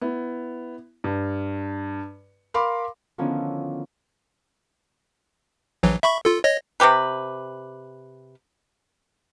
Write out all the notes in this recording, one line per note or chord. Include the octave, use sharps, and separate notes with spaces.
B3 E4
G2
A#4 F5 B5 C6 D6
D3 D#3 F3 B3 C#4 E4
A#1 E3 F#3
E5 B5 C#6
F4 A4
C#5 D#5 A#6
C3 F#3 G4 B4